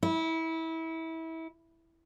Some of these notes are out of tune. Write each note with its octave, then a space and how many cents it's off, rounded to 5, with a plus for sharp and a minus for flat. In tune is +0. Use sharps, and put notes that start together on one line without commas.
E4 -25